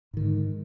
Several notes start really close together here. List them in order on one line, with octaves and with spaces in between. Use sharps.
G#2 D#3 D3 G#3